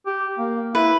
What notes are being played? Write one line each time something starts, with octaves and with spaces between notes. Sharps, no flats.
G4
A#3
E4 B4